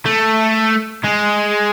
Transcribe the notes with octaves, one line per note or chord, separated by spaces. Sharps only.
A3
G#3